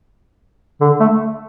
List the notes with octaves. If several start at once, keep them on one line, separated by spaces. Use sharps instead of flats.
D3
A3